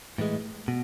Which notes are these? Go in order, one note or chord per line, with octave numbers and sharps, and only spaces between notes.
A2 E3 G#3
B2